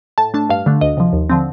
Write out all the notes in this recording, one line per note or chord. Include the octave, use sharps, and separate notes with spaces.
A2 A5
A3 D4 A5
G2 F5
D3 A3 D4
D2 D#5
C3 F3
D#2
D3 F3 C4